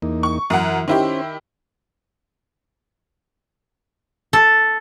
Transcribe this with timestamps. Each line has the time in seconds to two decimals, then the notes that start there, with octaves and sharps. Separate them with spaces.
0.02 E2 A#3 D#4
0.23 C#6
0.50 F#2 E3 F#5
0.88 D#3 C#4 E4 G4 C5
4.33 A4